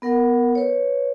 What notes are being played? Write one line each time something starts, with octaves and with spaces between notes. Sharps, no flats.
B3 A#4 F#5
B4 C#5